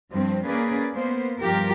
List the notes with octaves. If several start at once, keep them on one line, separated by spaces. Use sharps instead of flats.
G2 F3 C4
A#3 C#4 G#4 B4 D5
A#3 B3 C5
G2 F3 F4 G4 A#4